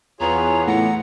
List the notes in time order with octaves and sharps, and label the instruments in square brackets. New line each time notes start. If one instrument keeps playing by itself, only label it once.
[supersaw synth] E2 E3 B3 [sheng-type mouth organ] F4 G#4 C#5 [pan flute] A#5
[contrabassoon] A2 [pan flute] F#5 [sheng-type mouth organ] A#5